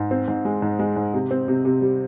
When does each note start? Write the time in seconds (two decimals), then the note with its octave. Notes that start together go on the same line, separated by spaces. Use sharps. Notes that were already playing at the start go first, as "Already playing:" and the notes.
Already playing: G#2
0.11 C4
0.28 G#2
0.45 G#3
0.62 G#2
0.79 G#3
0.96 G#2
1.14 C3
1.31 C4
1.48 C3
1.65 C3
1.82 G3